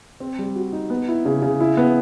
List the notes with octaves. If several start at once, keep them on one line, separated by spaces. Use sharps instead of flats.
C4
G3
F#4
D#4
B3
E4
C#3
C#3
E4
B3